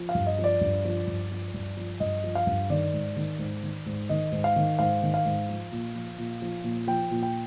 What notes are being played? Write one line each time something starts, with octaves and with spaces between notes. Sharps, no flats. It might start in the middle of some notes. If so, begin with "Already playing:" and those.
Already playing: F3
F5
G2
D#5
F3
D5
G2
F3
G2
F3
G2
F3
G2 D#5
F3
F5
G2
D#3 D5
G#2
D#3
G#2
D#3
G#2
D#3 D#5
G#2
F5
D#3
G#2 F5
D#3
F5
G#2
F3
A#2
F3
A#2
F3
A#2
F3 G5
A#2
G5